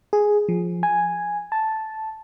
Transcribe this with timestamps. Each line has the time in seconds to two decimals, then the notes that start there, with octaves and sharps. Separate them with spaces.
0.13 G#4
0.49 F3
0.83 G#5
1.52 A5